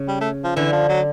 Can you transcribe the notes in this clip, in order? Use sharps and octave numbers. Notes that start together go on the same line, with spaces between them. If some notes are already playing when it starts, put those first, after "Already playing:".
Already playing: C#3
G3
A3
F3
D3 E3
F3
F#3